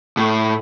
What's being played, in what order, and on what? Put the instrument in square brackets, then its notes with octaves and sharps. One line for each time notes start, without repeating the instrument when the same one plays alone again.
[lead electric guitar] A2